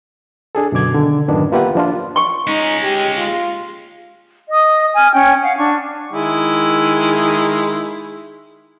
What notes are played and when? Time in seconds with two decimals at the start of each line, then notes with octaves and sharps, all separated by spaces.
0.55 D4 G#4 A4
0.72 F#2 B2 D3 D6 G#6
0.95 D3 D#3
1.28 F#2 A2 D#3 B3 D4
1.52 A#3 F4 G4 B4 E5 F#5
1.75 F3 D4 F4
2.16 C6 C#6
2.47 G#3 C#4 D#4
2.82 G4
3.17 F4
4.50 D#5 D#6
4.94 G#5 F6
5.12 C#4 G5
5.42 F5 F#5
5.57 D4 C#6
6.12 D#3 G#3 E4